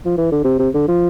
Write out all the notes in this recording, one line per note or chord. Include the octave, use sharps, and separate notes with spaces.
F3
E3
D3
C3
C3
D3
F3